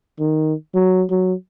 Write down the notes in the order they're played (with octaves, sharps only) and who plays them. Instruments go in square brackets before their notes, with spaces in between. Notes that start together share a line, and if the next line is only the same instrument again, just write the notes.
[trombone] D#3
F#3
F#3